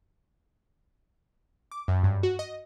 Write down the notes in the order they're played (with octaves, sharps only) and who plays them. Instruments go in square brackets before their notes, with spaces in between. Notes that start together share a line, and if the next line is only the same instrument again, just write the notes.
[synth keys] D6
F#2
G2
F#4
D#5